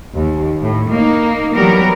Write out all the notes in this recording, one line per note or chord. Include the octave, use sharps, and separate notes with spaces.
D#2
A2
A#3 D#4
E3 F#3 G3 B3 G4 A#4